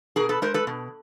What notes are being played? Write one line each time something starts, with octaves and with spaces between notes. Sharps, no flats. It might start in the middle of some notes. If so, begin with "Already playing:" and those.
B2 G#4 A#4
A4 B4
G#3 A#4 C5
A4 B4
B2